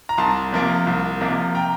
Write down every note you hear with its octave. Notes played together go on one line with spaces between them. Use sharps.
A#5
C2 A5 C6
C3 F3 A#3
C2
C3 F3 A#3
G5 A#5